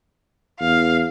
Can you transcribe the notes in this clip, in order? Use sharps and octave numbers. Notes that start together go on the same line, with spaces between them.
E2 F5